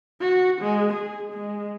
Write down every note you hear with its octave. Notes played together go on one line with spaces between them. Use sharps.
F#4
G#3
G#4
G#3